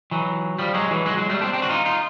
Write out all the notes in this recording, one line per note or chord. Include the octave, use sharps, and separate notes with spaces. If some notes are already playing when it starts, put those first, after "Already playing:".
E3 F#3
F3 G3
F#3 G#3
E3 F#3
F#3 G#3
F#3 G#3
G3 A3
C4 D4
C4 D4
F#4
D#4 F4
D#4 F4